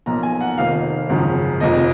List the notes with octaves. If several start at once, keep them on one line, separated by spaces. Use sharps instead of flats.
B1 A#2 F3 A#5
G#5
F#5
F1 F2 D#3 F5
G#1 F#2 C#3 F3
F1 F2 F3 D#5